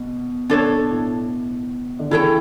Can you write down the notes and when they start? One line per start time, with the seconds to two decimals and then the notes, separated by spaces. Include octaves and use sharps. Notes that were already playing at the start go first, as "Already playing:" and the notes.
Already playing: B2
0.50 B2 D4 A4 C#5
0.90 A2
1.99 D3
2.11 C#3 E3 E4 A4 C#5 G5